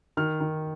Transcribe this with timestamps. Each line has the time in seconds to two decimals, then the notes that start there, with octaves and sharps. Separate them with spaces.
0.17 D#3 F6
0.40 D#3